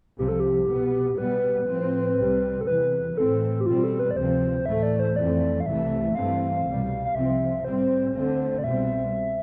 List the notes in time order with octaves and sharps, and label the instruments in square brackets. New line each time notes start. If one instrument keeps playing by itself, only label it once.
[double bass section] C2 C3 F3 [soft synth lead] G4
[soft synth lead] A4
G4
[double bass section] B2 B3
[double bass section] B2 G3 B3 [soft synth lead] B4
[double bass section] A2 F3 C4
C2 C3 G3 C4
[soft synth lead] A4
[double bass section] E2 C3 E3 [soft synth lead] B4
[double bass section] A2 E3 A3 C4 [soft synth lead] A4
[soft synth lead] G4
[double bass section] B2 G3 C4 [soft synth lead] F4
[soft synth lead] A4
B4
D5
[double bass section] D2 C3 F3 C4 [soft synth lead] C5
[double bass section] A2 E3 A3 [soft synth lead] E5
[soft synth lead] D5
C5
[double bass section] F2 E3 A3 C4 [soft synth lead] D5
[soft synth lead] F5
[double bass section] C2 C3 E3 A3 [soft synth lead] E5
[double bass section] G2 E3 A3 C4 [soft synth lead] F5
[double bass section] C2 B2 G3
[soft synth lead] F5
[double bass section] C2 C3 F3 C4 [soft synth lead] E5
[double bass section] A2 G3 C4 [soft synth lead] C5
[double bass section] D2 D3 A3 C4
[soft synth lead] D5
[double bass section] C2 B2 G3 C4 [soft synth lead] E5